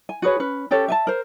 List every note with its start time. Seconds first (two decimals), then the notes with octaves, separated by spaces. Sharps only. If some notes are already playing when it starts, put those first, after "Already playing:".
0.09 G#5
0.22 F#4 G#4 B4 C#5
0.40 C#4 B4
0.71 C#4 G4 A4 C#5
0.88 E5 G#5 A5
1.07 A#4 C5